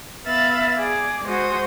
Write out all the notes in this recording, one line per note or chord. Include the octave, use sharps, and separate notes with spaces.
B3 E5 F5 B5 A6
G#4 D5
G#3 F#4 C5 D#6